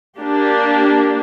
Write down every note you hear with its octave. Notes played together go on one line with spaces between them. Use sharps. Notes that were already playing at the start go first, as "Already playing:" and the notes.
A#3 D4 G4